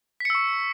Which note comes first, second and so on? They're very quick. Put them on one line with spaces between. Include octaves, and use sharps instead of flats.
B6 C#7 E6 C#6